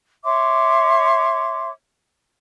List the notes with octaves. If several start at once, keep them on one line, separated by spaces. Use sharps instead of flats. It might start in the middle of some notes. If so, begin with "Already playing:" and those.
C#5 E5 C6 D6